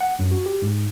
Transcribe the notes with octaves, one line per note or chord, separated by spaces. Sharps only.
F#5
F#2
F#4
G4
G#2